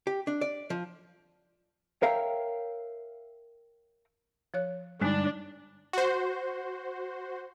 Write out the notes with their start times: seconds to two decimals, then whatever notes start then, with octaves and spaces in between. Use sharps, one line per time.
0.07 G4
0.27 D4
0.41 D5
0.70 F3
2.03 A#4 C#5 E5 F5 G5 A#5
4.54 F3 C#5 F#6
5.01 G2 D3 G#3 D4 D#4
5.93 F#4 C5